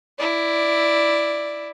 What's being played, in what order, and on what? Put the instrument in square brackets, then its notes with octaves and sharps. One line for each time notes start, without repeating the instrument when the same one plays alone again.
[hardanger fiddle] E4 D5